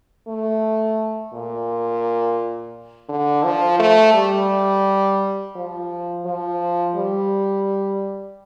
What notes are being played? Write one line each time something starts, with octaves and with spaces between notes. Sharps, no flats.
A3
A#2
D3
F3
A3
G3
F3
F3
G3